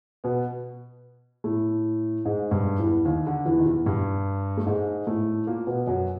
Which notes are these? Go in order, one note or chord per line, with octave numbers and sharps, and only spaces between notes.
B2 B3
A2 A3
G#2 G#3
G2 G3
E2 E3
D#2 D#3
D3
E2 E3
D#3
E2 E3
G2 G3
A3
G#2 G#3
A2 A3
A#2 A#3
B2 B3
F#2 F#3